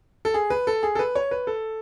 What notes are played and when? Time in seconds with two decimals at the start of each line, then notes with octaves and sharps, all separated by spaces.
0.25 A4
0.34 G#4
0.50 B4
0.67 A4
0.83 G#4
0.95 A4
0.99 B4
1.15 C#5
1.31 B4
1.47 A4